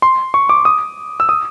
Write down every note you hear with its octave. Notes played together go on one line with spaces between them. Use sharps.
C6
C#6
D6
D#6
E6
D#6